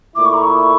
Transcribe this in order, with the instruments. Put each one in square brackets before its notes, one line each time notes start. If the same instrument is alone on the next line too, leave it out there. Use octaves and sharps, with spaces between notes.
[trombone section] A#2 A3 E4 [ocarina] D6
[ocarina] C#6
A#5
C#6